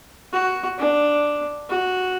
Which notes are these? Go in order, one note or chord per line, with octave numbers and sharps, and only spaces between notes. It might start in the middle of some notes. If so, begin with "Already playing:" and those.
F#4
D4
F#4